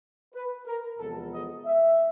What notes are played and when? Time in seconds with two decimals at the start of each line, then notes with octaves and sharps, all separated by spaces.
0.34 B4
0.66 A#4
0.99 E2 C3 F3 G#3 B3 A4
1.33 D#5
1.65 E5